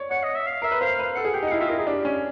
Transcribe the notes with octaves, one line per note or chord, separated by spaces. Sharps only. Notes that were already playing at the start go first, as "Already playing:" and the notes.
Already playing: C#5 D5
C#5 F#5
D#5
E5
F5
A#4 E5
B4
C5 F5
B4
A4 F#5
G#4
G4 G5
D#4
F#5
E4 F5
F4 E5
E4 A#4
D#4 G#4
D4 G4
C#4